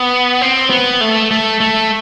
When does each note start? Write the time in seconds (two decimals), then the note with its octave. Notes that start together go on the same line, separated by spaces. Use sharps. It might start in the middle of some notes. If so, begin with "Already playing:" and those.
Already playing: B3
0.41 C4
0.70 B3
1.01 A3
1.31 A3
1.60 A3